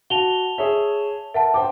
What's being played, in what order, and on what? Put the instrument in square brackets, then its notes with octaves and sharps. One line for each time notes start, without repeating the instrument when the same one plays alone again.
[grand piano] F#4 [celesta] A5 F7 G7
[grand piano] G#4 C#5 E5
[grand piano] A#4 [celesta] E5 F#5 A5
[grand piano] C5 G5 D6